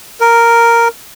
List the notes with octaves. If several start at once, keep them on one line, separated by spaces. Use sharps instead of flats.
A#4